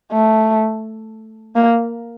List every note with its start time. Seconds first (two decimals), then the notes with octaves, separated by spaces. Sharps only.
0.12 A3
1.56 A#3